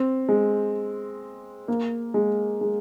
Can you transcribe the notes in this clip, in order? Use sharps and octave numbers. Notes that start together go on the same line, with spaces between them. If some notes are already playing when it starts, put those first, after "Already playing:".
Already playing: C4
G#3
A#3
G#3
G#3